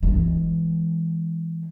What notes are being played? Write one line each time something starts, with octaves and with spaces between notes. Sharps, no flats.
E3 G#3